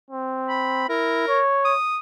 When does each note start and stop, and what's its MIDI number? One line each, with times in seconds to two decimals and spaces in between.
0.11 0.86 60
0.49 0.87 83
0.89 1.26 64
0.89 1.40 70
1.28 1.74 73
1.65 1.99 87